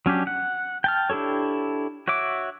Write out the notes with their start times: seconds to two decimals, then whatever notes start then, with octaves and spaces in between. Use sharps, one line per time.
0.06 F#3 C#4 D4 G4
0.27 F#5
0.84 G5 A5 F6
1.10 D4 E4 G4 A4 C#5
2.08 F#4 C#5 E5 D6